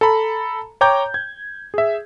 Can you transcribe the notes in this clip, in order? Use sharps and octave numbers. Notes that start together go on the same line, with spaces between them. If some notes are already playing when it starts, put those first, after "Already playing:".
A4 A#5 B5
C#5 G5 A#5 D6 G6
G#6
G#4 E5